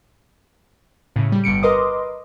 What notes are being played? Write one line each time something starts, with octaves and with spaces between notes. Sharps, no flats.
A2 C#3
G3
G1 G3 C#7 D7
A#4 B4 D#5 C6 D6 D#6